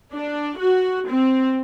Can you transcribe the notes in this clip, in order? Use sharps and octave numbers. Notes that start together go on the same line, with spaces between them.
D4
F#4
C4